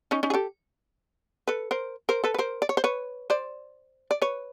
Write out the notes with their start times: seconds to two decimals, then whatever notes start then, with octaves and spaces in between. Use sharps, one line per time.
0.11 C#4 D#4
0.23 C#4 D#4
0.30 G#4
0.34 G4 A4
1.48 A4 B4
1.71 A#4 C5
2.09 A#4 C5
2.24 A4 B4
2.34 B4
2.38 A#4 C5
2.62 D5
2.69 C#5
2.77 C5
2.84 B4 C#5
3.30 C5 D5
4.11 D5
4.22 B4 C#5